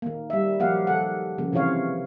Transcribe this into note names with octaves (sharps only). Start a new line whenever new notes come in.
D#3 A#3
G3 E5
F3 F#3 A#3 G4 F5 F#5
D#3 A4 F#5
C#3 F3 A#3
C3 E3 F4 C#5 F5